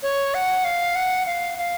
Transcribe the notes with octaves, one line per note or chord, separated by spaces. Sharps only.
C#5
F#5
F5
F#5
F5
F5